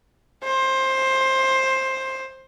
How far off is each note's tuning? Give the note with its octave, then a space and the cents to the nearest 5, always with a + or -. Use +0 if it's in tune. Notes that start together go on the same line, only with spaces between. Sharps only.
C5 +15